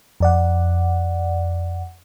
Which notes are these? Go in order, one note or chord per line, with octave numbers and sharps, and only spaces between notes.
F2 D5 F#5